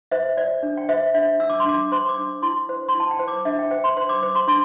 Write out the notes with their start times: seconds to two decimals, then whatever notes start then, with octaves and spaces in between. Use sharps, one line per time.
0.11 C5 E5
0.37 C5 D5
0.63 D4
0.77 G5
0.89 C5 E5
1.14 D4 E5
1.40 D4 E6
1.50 D6
1.60 C6
1.65 D4 D6
1.92 C5 C6
2.09 D6
2.18 D4
2.43 E4 C6
2.69 C5
2.88 C6
2.95 E4
3.00 A5
3.11 G5
3.19 C5
3.28 D6
3.45 D4 E5
3.59 G5
3.71 C5 G5
3.84 C6
3.97 C5 C6
4.09 D6
4.22 C5 D6
4.35 C6
4.47 D4 C6